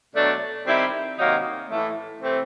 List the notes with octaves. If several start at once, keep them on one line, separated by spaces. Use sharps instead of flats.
B2 F#3 A3 D4
D#3 G3 C4 E4
C3 D#3 F#3 A#3 D#4
A2 E3 A3
C3 E3 A3 C4